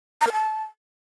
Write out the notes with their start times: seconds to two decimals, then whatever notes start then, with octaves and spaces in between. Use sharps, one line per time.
0.21 A#5
0.27 A#4
0.33 A5